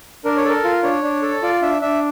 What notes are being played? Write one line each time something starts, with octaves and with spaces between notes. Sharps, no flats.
D4 A#4
C#5
A4 A#4
F4
D4 C#5
D4
A4
F4 D5
D4 E5
D4 E5